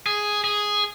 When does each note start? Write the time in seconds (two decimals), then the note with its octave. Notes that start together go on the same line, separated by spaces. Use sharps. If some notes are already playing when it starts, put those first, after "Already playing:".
0.06 G#4
0.44 G#4